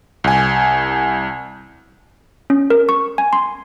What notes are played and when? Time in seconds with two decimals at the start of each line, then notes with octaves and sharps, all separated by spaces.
0.24 C2 G#5
2.50 C#4
2.70 A#4
2.89 C#6
3.18 G#5
3.33 C6